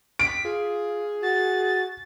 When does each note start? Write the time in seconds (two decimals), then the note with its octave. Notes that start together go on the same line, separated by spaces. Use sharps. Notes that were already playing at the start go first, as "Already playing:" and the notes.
0.19 B6 D7
0.45 F4 G#4
1.23 F#4 A6